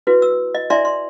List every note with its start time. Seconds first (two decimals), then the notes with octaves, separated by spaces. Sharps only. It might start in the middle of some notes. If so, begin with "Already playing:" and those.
0.07 E4 F#4 B4
0.22 E6
0.55 D#5
0.70 E4 D5 E5 G#5 A#5 C6
0.85 C6